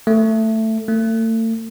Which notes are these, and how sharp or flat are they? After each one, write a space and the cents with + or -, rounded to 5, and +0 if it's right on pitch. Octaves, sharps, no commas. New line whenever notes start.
A3 +10
A3 +35